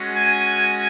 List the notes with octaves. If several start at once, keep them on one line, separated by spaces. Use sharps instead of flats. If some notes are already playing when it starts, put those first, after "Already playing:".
Already playing: G#3 C#4 F#4
G#5